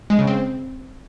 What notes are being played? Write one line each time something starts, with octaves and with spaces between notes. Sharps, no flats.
G#3
C#3
C4